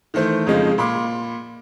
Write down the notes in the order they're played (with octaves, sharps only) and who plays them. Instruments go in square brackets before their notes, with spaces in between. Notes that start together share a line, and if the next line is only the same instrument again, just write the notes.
[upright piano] D#3 E3 A3 C5
F2 C#3 F3 G#3 D#4
A#2 B5 C6 D6